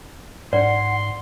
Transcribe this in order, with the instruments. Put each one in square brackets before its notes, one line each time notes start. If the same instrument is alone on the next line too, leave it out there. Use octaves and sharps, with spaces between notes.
[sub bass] G#2 [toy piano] D5 [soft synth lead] F#5 [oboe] C6